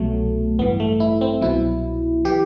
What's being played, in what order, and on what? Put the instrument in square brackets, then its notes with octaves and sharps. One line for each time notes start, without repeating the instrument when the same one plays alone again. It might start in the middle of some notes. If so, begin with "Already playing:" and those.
Already playing: [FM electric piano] C2 B2 F#3 A3
A1 G2 E3 B3
A3
E4
C4
C2 B2 F#3 E4
E3 G4